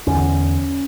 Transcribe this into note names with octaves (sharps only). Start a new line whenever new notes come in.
E2 D3 C#4